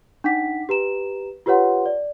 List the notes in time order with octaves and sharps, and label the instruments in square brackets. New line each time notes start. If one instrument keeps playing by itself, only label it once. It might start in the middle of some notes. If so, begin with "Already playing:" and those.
[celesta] D4 D#4 F#5 D6 B6
G4 B4 A#5 E7
F4 G4 B4 C#5 F#5 C6
D5